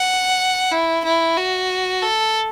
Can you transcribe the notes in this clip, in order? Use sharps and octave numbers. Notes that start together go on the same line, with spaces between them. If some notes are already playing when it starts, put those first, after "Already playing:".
Already playing: F#5
E4
E4
F#4
A4